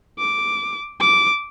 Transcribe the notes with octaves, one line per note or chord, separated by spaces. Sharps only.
D6
D6